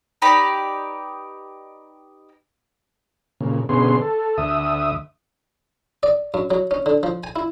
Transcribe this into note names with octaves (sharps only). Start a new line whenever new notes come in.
D#4 G4 B4 D5
A#2 C#3
B2 D3 B3 C#4 G#4 C6
A4
D2 E5 D#6
D5
F#2
F#3
C#4
D3
F3
G#5
E4